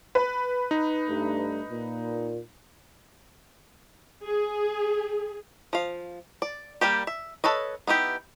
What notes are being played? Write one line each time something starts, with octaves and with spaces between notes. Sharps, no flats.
B4
D#4
G2 A3
A#2
G#4
F3 F5
D5
G3 A#3 G4
E5
A4 B4 C#5 D#5
B3 D#4 E4 G4